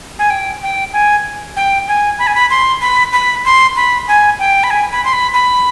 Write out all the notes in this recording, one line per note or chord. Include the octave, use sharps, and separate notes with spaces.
G#5
G5
G5
G#5
G5
G#5
B5
G#5
B5
C6
B5
B5
C6
B5
G#5
G5
B5
G#5
B5
C6
B5
B5